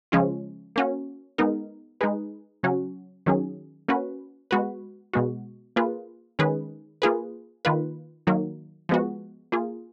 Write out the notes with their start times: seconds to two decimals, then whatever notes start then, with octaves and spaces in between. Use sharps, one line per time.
0.12 C#3 F3 G#3 C#4 F4
0.76 A#3 C#4 F#4
1.38 G#3 B3 D#4 A#4
2.01 G#3 D#4 G#4 B4
2.63 C#3 F#3 C#4 F#4
3.26 D#3 F#3 C#4 G#4
3.88 A#3 C#4 F#4 B4
4.51 G#3 B3 F#4 B4
5.13 B2 G#3 B3 F#4
5.76 A#3 F4 G#4 B4
6.39 D#3 G#3 C#4 G#4 B4
7.02 A#3 F4 G#4 B4
7.65 D#3 A#3 F4 B4
8.27 D#3 F#3 A#3
8.89 F3 G#3 B3 F#4
9.52 A#3 F4 G#4